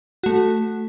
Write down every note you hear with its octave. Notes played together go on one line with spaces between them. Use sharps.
A3 F#4